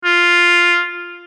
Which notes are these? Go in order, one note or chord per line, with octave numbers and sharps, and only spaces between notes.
F4